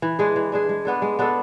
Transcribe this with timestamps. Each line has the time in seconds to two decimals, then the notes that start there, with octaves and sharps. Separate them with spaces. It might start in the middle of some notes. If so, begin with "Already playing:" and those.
0.02 E3
0.19 G#3 D4 G#4
0.36 E3
0.52 G#3 D4 G#4
0.69 G#3
0.85 B3 D4 A4
1.02 G#3
1.19 B3 D4 A4